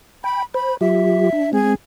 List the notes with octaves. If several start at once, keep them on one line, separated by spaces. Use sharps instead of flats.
G5 B5
C5 B5
F#3 F4 G4 E5
D4
G#3 C4 G#4